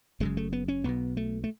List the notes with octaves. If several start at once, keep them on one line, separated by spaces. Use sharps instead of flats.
F#1 F#2 C#3 G#3
A3
B3
C#4
B1 B2 B3
A3
A3